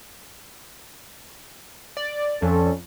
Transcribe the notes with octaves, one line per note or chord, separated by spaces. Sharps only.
D5
F2 C#4 A4 D5